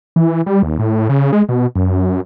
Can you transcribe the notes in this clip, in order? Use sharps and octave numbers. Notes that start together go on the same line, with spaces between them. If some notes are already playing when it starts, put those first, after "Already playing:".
E3
G3
D#2
A2
C#3
G#3
B2
F#2